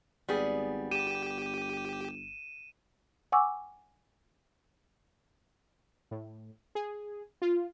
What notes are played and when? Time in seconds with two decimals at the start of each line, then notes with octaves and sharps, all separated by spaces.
0.29 G#1 G3 B3 G#4
0.91 G1 G4 D#7 E7
3.32 F#5 G#5 C#6 D6 E6
6.11 A2
6.75 G#4
7.42 F4